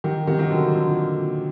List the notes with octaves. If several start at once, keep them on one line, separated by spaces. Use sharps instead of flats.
D#3 G3
C3 D#3
D#3
D3 F#3
A#2 D3